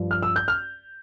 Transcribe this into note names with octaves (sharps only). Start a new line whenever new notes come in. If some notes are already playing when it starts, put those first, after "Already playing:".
Already playing: G2 F3
F6
E6
G6
F6